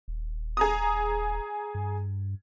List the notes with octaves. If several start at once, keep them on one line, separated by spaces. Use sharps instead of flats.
D#1
G#4 A#5 D#6
G2